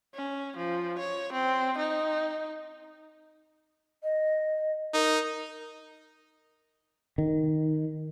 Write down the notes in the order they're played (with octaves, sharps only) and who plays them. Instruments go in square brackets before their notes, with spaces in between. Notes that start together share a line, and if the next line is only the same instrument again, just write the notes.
[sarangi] C#4
F3
C#5
C4
D#4
[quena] D#5
[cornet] D#4 [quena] A#4
[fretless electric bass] D#3